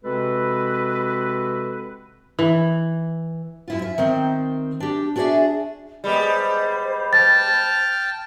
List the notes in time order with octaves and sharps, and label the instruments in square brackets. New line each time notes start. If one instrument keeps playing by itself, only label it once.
[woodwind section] C3 G#3 C4 F#4 A4 B4
[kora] E3
[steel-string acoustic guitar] F#2 E4 F4
E5
D#3 C4
D4 G4
D4 F#4 G#4 A4 D5 E5
[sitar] G3 G#3 B3 [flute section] C5 B5
[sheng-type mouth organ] G5 A5 F6 [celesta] A6